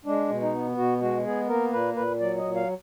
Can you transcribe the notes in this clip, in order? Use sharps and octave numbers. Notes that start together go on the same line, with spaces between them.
G#3 D4
B2
D#4
B3
B2 F#4
G#3 F#4
B3 G#4
A#3 A#4
A#2 B4
A#2 B4
F#3 D5
D#5
A#2
F5